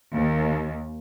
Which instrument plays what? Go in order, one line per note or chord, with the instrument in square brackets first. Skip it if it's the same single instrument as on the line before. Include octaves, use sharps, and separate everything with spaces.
[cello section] D#2